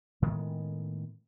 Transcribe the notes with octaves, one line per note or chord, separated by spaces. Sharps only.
A2 D#3 G#3 B3